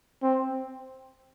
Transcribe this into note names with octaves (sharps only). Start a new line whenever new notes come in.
C4